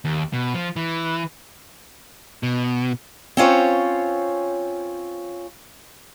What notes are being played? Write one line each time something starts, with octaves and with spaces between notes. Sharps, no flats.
D#2
B2
F3
E3
B2
C4 C#4 F4 C5 C#5